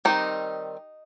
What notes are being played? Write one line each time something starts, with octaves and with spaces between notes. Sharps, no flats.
D#3 G3 C4 D#4